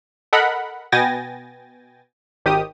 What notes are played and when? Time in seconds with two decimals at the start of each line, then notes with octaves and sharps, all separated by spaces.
0.33 A4 A#4 D#5 F#5 B5
0.92 B2 B3 G5 G#5 A6 A#6
2.45 G#1 D#3 G4 D#6